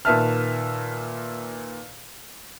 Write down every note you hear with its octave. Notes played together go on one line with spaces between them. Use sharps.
A#2 D#3 B4 E5 A5 F6